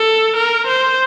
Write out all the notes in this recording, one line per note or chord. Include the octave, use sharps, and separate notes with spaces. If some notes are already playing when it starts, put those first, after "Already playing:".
Already playing: A4
A#4
C5